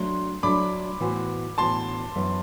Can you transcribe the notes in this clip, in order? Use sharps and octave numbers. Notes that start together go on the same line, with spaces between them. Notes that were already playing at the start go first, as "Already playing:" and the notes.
Already playing: F#3 A3 D4 C6
F#3 A3 D4 B5 D6
A2 E3 B3 F#4 C5
A2 E3 B3 F#4 C5 A5 C6
F#2 E3 B3